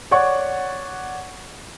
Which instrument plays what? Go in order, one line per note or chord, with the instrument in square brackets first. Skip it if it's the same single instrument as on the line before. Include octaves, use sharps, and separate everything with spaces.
[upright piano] C#5 D5 F#5 C#6